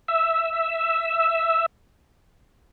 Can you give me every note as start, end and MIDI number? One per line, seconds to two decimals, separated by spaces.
0.08 1.66 76
0.08 1.66 88